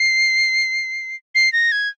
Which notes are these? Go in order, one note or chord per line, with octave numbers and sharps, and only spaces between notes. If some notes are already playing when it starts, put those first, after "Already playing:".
Already playing: C7
C7
A#6
G#6